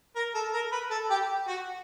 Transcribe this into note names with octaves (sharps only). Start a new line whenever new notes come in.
A#4
A4
A#4
B4
A4
G4
F#4